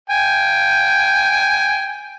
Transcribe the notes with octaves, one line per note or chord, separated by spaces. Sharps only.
G5 G#5